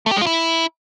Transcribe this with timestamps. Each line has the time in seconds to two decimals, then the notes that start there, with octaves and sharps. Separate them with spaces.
0.06 A3
0.11 G4
0.16 G#3
0.21 F4
0.26 E4